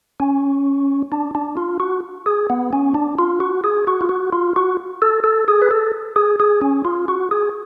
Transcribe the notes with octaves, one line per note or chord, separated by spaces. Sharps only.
C#4
D4
D4
F4
F#4
G#4
B3
C#4
D4
F4
F#4
G#4
F#4
F4
F#4
F4
F#4
A4
A4
G#4
B4
A4
G#4
G#4
C#4
F4
F#4
G#4